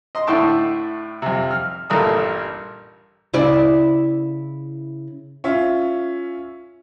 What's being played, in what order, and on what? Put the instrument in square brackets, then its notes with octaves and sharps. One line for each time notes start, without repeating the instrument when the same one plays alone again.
[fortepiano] D#5 C6
A2 D3 E4 G5 A5 C#6
F2 C3
F6
A1 G2 A#2 A4 A#4 D#6
[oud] C#3 E4 D5
[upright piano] C#4 F4 E5